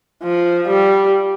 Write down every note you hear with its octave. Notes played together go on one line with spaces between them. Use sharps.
F3
G3